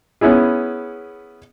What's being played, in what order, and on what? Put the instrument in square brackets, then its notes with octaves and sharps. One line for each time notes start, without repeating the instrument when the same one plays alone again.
[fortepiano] B3 C#4 E4 G#4